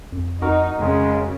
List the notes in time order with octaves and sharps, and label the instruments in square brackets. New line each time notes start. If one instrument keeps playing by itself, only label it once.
[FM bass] F2
[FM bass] F2 [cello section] D#4 [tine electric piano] F#4 A#4
[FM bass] F2 [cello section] C#3 [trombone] G#3